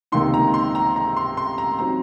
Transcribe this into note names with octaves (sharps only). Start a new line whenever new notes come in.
C#2 C3 D#3 A#3 D#4 C6
A#5
C6
A#5
A#5
C6
C6
A#5
F#3 C4 D#4 A#5